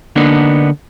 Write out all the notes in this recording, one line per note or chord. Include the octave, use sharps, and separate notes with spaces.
D3 A#3 B3 D4 D#4